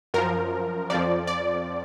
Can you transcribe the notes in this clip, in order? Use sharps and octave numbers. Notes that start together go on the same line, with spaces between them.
F#2 F3 A#4
F2 F3 D5
D5